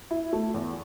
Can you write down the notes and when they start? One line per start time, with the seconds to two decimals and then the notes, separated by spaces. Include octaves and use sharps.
0.11 E4
0.33 A3
0.54 E2